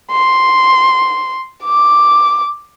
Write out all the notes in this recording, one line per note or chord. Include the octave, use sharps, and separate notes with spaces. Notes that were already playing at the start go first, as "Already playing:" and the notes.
C6
D6